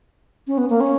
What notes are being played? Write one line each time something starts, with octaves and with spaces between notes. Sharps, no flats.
C#4
B3
A#3
C#4